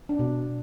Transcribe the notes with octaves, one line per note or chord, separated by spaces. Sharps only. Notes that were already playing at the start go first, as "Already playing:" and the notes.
D4
B2